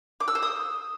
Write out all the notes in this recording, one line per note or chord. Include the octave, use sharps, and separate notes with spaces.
D6
E6
C5
D#6